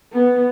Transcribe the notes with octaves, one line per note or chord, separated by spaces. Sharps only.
B3